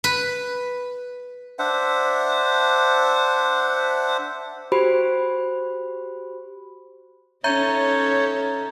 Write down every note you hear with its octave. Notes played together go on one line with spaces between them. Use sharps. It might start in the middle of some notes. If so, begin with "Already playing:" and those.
B4
D4 C5 E5 F#5
F#4 G4 C5 B5
C#4 D#4 A4 C#5 E5 A#5 G6